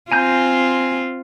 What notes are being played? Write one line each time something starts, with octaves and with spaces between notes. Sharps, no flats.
C4 F4 G#5 A#5 G6